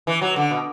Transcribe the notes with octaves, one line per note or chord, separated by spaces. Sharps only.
E3
F#3
D3
B2